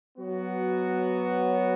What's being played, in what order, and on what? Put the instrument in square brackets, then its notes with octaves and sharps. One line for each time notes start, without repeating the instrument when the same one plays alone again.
[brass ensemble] F#3 B3 F#4